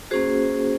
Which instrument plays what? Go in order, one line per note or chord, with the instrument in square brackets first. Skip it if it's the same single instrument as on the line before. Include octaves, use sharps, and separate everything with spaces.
[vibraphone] A#3 C#4 F#4 G#4 C5